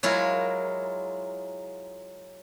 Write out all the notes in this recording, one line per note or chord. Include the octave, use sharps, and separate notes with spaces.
F#3 G#3 E4 F4 A#4